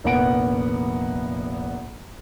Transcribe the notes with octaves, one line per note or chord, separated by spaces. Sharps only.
F1 A#1 A#3 B3 F#5 D7